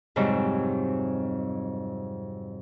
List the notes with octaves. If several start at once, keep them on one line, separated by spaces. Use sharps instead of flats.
F2 G#2 C3 F#3 G3